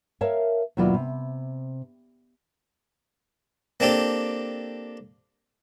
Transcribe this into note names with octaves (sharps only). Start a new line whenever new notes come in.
A#4 C#5 E5 F5 A5
D#2 B2 F#3 E4 F4 D5
C3
A#3 C4 D4 G4 A4